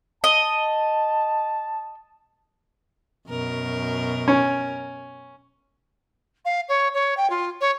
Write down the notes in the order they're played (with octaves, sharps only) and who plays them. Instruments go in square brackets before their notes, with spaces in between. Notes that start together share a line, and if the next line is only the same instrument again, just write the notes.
[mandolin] D#5 [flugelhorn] A5
[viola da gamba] F#2 B2 A#4
[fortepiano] C#4
[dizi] F5
C#5
C#5
G5
F4
C#5